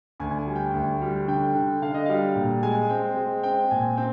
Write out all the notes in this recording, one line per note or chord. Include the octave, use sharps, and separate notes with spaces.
D2 G#5
G#5
G3
G5
D2
G3
D3 G5
D3
D3 F5
D#5
G3 F5
A#2
G#3 G#5
C4 G5
G#3
C4 G5
A#2 G#5
C4 G5